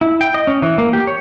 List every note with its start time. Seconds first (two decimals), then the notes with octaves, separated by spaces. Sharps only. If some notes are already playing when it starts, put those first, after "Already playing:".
0.01 E4
0.21 G5
0.34 D#5
0.47 C#4
0.62 E3
0.78 A#3
0.93 G4
1.07 C#5